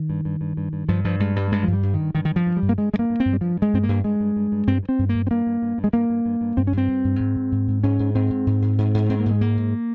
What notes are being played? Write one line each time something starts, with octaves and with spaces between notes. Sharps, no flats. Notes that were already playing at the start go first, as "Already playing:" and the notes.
Already playing: D#3
G2
G2
G2
G2
G2
G2 F3
G2 F3
G2 G#3
G2 G3
G2 G#3
G2 F3
G3
G2
D#3
G2
G2 D#3
D#3
G2
F3
G2
G3
G2
A#3
G2 G#3
G2 G#3
A#3
G2
C4
G2
G3
G2 F3
G2
G#3
G2 C4
A#3
G2
G2 G#3
G2
G2
G2
G2 C4
G2
C4
G2
A#3
G2
C4
G2 A#3
G2
G2
G2
G#3
G2 A#3
G2
G2
G2
G2 C4
C#4
G2 C4
G2
G2
G#2
G#2
G#2
G#2
G#2 C#4
G#2
G#2 C4
G#2
G#2
G#2
G#2
G#2
G#2 C4
A#3
G#2 G#3
G#2 A#3
G#2